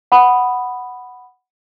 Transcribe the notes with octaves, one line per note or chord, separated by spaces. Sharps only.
F#5 B5 D#6